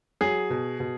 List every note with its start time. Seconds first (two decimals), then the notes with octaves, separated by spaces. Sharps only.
0.21 F#3 G#4
0.50 B2
0.80 B2